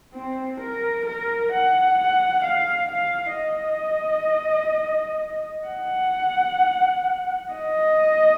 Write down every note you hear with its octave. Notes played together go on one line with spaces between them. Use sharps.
C4
A#4
A#4
F#5
F#5
F5
F5
D#5
F#5
D#5